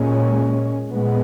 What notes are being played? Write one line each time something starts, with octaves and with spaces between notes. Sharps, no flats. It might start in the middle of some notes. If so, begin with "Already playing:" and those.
Already playing: A#2 G#3 C#4
A#2 G#3 B3